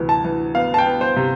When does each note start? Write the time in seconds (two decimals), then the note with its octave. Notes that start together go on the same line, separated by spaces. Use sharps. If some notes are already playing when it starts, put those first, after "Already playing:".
Already playing: D2 C3 E3
0.09 A5
0.24 E3
0.55 B3 F5
0.74 A5
0.78 G5
0.86 B3
1.01 C5
1.16 C3